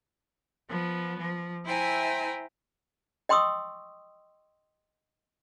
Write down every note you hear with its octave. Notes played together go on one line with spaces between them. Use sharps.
F3 B3
F3
E4 C5 E5 G5 G#5 A#5
D#5 G5 C6 C#6 D#6 E6